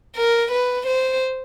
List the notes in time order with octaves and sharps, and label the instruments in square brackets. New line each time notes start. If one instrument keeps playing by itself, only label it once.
[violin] A#4
B4
C5